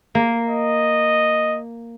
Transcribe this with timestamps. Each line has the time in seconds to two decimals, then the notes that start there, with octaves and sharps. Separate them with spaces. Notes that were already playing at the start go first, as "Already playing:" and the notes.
0.15 A#3
0.49 D#5